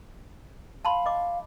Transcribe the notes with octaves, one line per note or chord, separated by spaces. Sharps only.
F5 A5 B5 C6
D#5 D6